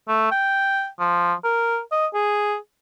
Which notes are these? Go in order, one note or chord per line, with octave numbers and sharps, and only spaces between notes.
A3
G5
F3
A#4
D#5
G#4